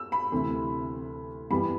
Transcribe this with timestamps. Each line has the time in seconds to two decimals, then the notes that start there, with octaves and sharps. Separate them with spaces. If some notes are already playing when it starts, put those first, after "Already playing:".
Already playing: E6
0.12 B5
0.32 D2 C3 E3
1.50 G2 E3 G3 B3 B5